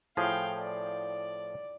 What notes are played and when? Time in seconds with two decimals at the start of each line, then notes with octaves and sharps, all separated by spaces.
0.17 A2 F3 G#4 F5 G5
0.58 D5